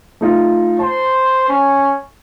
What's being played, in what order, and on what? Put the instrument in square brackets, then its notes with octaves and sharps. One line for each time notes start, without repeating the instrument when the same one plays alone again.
[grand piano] A3 D#4 F4
[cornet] C5 [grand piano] A5
[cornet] C#4